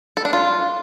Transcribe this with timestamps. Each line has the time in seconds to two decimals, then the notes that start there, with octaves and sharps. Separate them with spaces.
0.17 A4
0.25 D4
0.33 F4